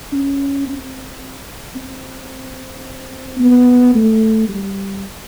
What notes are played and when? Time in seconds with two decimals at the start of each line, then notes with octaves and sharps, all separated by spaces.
0.13 C#4
0.68 C4
1.76 C4
3.39 B3
3.95 A3
4.49 G3